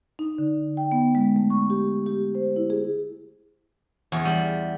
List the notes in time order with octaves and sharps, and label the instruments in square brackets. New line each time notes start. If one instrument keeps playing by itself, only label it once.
[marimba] D#4
D3
G5
B3
G#3
A3
C#6
G4
G4
C5
E4
G#4
[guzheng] E2
G3